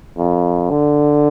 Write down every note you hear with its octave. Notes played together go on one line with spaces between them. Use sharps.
F2
D3